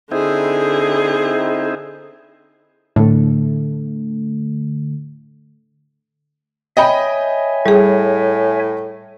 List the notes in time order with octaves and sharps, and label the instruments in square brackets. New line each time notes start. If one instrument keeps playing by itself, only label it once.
[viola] D3 G#4 [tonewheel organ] C4 D#4 E4
[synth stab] A2 [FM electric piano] D3 A3
[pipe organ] C#5 E5 G#5 [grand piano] D#5 G5 B5
[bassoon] A2 [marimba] G3 G#4